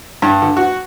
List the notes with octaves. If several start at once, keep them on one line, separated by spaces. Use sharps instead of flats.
G2
D3
F#4